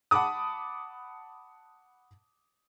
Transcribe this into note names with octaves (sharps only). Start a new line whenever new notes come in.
F#5 A5 B5 D6 D#6